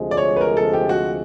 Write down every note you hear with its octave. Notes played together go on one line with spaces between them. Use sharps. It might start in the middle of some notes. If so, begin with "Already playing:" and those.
Already playing: D2 C3 F3 G#3
D5
C#5
B4
A#4
A4
G4
F#4